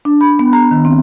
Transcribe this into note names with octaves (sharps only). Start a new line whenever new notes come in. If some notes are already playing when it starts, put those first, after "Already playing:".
D4
B5
B3
A#5
D#3
C4